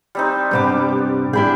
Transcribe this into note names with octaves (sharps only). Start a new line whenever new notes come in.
G3 C4 D#4
G2 C3 G3 B3 D6
D4 E4 G#4 G5 B5